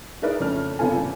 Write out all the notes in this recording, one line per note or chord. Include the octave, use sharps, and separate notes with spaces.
D#4 E4 G#4 A#4 B4 D5
F2 C#3 A3 D4 C#5 F6
F#1 C3 B3 F4 A4 G#5
A1